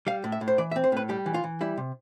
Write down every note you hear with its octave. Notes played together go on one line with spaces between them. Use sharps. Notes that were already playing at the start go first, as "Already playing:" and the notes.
G3 F5
A2
E5
A2
C5
E3 D5
E5
C4
C5
A2 B4
G3 G4
E3
F4
E3
G3 E4
C3